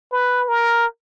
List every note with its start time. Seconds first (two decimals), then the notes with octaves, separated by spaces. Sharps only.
0.12 B4
0.48 A#4